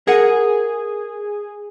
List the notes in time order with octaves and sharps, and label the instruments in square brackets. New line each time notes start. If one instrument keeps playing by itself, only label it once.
[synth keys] G#4 [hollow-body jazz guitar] A#4 F#5